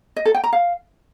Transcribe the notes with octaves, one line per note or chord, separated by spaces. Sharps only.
D#5
A4
G5
A#5
F5